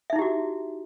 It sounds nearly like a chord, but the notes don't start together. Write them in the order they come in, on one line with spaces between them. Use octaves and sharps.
E5 D#4 E4 G4 F#4